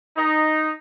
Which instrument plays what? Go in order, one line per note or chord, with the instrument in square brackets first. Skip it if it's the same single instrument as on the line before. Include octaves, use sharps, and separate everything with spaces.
[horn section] D#4